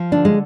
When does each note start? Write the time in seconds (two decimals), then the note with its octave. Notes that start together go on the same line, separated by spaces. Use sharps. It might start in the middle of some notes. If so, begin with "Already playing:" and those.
Already playing: F3
0.12 D3 D4
0.25 G#3